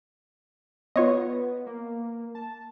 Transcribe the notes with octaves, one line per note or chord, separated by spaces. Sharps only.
B3 F4 C#5 D#5
A#3
A5